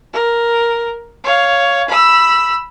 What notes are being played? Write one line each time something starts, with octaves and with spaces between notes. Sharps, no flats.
A#4
C#5 F5
B5 E6